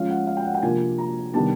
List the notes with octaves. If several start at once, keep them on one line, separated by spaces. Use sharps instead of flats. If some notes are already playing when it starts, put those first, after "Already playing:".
Already playing: F3 G#3 C#4 F5
F#5
F5
G5
F#5
G5
C3 F3 A#3 D4 G#5
A#5
C3 D#3 G3 B3 D4 A5